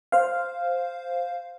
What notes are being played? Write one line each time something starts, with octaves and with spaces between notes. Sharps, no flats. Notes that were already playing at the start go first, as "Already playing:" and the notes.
C5 F5